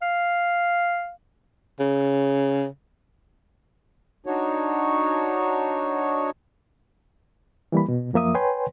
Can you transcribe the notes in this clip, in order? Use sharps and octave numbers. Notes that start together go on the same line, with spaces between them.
F5
C#3
D4 D#4 F#4 C#5
E3 G3 A#3 B5
B2
F#2 F3 A#3 E5 D#6
B4 C#5 G5 G#5 C6